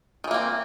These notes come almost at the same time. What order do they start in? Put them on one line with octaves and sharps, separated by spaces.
D#3 E3 A#3 C4